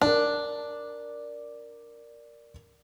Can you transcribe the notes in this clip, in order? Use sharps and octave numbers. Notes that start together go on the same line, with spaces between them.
D4 A#4 D5